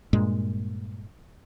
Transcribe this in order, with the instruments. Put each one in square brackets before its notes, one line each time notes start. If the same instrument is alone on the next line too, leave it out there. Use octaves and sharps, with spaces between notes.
[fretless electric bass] G2 A#2 G#3